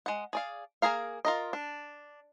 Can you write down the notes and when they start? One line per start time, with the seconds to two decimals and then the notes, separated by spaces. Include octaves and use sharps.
0.06 G#3 F#5
0.33 G#4 D5 F5
0.82 A#3 E4 G#4 A#4 F5
1.25 F4 A#4 D#5
1.53 D4